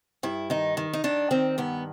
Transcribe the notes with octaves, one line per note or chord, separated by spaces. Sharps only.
G2 E4
D#3 D#4
D#3
D#4
D#3 D4
D#3 C4
G2 B3